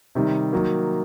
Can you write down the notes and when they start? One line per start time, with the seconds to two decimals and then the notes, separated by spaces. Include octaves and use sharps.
0.15 C3 D#3 G3
0.53 D#3 F#3 A#3